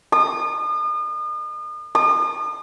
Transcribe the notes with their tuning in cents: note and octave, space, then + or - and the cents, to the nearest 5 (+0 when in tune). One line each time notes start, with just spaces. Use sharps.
D#6 -40
D#6 -45